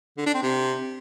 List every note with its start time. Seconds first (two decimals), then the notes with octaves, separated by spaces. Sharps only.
0.18 D3
0.26 D4
0.34 C4
0.43 C3